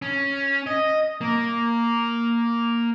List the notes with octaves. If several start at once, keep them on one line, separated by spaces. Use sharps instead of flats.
C#4
D#5
A#3